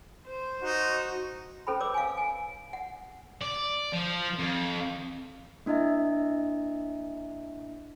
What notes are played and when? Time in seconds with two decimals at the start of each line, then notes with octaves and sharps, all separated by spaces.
0.26 C5
0.62 D#4 F#4
1.67 C#4 A4 C5 G5 B5
1.80 B4 C#5 D6 E6
1.94 F5 G#5
2.17 G#5
2.73 F#5
3.41 D5
3.93 F3
4.39 F2
5.66 A#3 D4 E4 D#5 E5